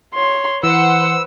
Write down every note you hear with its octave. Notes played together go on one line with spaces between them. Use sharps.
C#5 C6
E3 B4 C5 F#5 E6